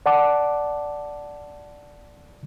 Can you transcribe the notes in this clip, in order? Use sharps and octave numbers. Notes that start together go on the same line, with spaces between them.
D5 F#5 A5 D6